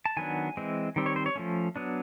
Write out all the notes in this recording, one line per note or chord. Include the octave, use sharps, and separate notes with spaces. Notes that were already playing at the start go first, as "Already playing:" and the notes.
A5
D#3 F#3 B3 D4 G#5
E3 G#3 C4
D#3 G3 C4
C#5
C5
C#5
F3 A3 C#4
F#3 B3 D4